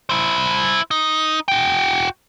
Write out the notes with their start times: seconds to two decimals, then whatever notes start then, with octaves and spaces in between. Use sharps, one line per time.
0.09 E4 C5
0.91 D#4
1.48 F#4 G5